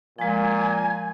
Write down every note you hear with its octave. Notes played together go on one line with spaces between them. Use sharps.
A#2 F3 G#3 G#5